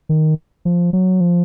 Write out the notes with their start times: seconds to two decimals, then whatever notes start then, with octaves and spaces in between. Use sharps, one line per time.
0.09 D#3
0.65 F3
0.93 F#3
1.21 F3